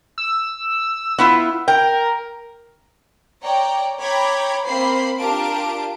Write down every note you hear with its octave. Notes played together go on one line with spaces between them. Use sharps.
E6
B3 E4 F4
A#4 G5
C#5 D5 G5 A#5
C#5 G5 A#5 B5 D6 G#6
A#3 C4 C5 B5 C7
D4 F4 G4 A#4 A5 D7